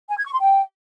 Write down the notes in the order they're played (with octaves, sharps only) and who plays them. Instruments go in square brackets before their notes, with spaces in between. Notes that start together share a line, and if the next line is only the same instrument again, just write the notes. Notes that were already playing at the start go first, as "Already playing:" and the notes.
[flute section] G#5
G#6
C#6
C6
G5